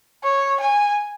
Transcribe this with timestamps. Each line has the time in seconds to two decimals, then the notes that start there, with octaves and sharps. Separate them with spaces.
0.23 C#5
0.60 G#5